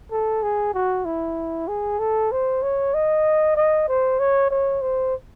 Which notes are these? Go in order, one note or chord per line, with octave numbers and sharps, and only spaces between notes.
A4
G#4
F#4
E4
G#4
A4
C5
C#5
D#5
D#5
C5
C#5
C#5
C5